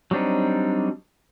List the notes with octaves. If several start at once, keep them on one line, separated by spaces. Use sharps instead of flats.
F#3 G3 C4 D4 D#4